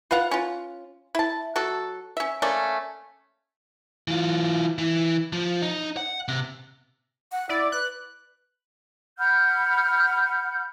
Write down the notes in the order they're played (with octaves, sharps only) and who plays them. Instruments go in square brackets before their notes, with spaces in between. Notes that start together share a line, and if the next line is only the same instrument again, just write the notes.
[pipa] F4 B4 F5 F#5
C#4 F4
E4 A5
F#3 F#4 A4
C#4 E5
A3 A#3 C#4 D5
[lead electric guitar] E3 F4
E3
F3
D#4
F#5
C3
[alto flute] F#5
[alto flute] E4 [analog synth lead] D5
[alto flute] B4 [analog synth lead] F#6
[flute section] F#5 B5 F6 G6